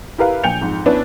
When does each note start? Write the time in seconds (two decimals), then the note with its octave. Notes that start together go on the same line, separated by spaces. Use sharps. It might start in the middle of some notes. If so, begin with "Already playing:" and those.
0.18 E4 G4 A#4 B4 F5
0.44 A#1 G5 G#5 G6 C#7 F7
0.61 F2 G#2
0.86 B3 C#4 D4 E4 B4